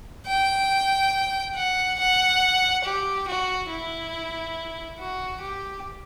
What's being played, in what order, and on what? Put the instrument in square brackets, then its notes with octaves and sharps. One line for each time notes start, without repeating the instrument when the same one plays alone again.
[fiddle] G5
F#5
F#5
G4
F#4
E4
F#4
G4